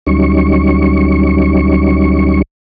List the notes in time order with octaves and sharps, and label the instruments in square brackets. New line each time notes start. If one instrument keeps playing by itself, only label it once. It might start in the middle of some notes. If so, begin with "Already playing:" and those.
[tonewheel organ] D2 F#3 G3 C#4 D#4 C#6